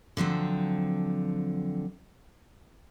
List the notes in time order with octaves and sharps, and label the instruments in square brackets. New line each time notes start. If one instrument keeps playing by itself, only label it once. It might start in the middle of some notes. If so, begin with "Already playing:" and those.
[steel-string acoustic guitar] D3 F3 F#3 C4